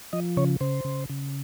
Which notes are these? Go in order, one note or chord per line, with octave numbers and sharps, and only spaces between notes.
F3 D#5
C#3 C#5
C#3 C5
C#3
C#3